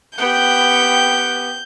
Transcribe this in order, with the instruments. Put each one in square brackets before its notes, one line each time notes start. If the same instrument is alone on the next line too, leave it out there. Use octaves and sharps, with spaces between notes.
[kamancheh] B3 G4 [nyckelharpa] F#5 G5 [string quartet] G6